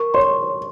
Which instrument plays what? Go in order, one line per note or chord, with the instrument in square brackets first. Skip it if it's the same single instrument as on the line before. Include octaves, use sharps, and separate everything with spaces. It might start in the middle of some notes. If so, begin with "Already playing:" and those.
Already playing: [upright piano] A#4 [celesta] C#6
[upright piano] C#5 [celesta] C6